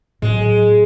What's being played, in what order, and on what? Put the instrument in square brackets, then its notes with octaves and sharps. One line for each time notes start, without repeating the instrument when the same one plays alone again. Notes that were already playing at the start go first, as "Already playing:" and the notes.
[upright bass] A2 F#3 [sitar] G#3